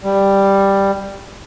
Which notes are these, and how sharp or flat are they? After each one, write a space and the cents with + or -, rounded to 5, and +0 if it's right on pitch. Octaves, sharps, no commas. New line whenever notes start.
G3 +5